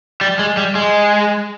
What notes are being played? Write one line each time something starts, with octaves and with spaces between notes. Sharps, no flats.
G3
G#3
G3
G#3